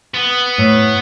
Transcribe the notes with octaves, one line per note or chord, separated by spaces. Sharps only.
B3
A2